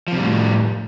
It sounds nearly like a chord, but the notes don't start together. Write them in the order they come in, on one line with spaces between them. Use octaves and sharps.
F3 C3 G3 A2